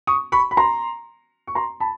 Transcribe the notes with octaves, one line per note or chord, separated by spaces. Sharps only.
C#6 D#6
B5 C#6
B5
A#5 C6
C#6
A#5 C6
A5 B5